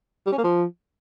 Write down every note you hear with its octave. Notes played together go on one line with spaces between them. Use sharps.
G3
C#4
A#3
F3